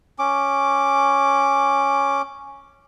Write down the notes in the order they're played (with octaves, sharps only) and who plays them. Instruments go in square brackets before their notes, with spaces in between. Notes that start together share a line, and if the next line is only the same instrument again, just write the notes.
[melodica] C#4 D6